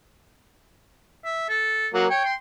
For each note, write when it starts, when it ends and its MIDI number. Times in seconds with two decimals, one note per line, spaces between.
1.25 1.45 76
1.49 1.88 69
1.94 2.06 54
1.94 2.06 58
2.10 2.21 73
2.10 2.32 79
2.25 2.35 84